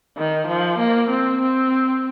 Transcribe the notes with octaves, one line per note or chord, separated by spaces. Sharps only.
D#3
F3
A#3
C4
C4